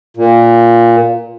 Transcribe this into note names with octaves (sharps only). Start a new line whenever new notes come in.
A#2